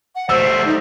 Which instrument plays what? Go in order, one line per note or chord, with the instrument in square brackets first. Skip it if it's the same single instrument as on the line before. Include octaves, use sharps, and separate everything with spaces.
[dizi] F#5
[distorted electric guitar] G3 A3 [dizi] C5 [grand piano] E6
[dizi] D#4